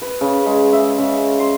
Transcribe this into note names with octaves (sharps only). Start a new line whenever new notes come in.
B4
C#3
G#3
E5
C#3
C6